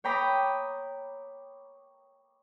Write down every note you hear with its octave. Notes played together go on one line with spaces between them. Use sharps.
C#5 G5 A#5 B5 D6 D#6